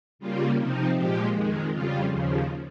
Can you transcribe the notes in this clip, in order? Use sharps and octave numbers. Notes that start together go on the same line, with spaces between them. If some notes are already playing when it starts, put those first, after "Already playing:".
C#3 G3 A#3 F4
C3 F3 C4 D#4
A#2 F3 G#3 G4
F2 D#3 G#3
F2 C#3 G3 F4
D#2 C#3 F3